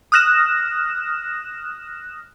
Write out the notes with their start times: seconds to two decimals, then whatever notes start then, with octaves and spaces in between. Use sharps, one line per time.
0.12 D#6 F6 F#6 A#6 E7